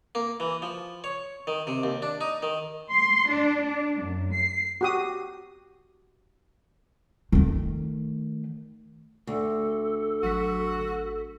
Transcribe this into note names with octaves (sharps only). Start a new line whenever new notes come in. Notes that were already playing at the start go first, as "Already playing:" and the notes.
A#3
E3
F3
C#5
D#3
C3
D#2
D4
D#4
D#3
C6
D4
D4
F#2
C7
F#4 G4 D#6
D#3 A3
D2 A4
G#1 F#3 F#4 B6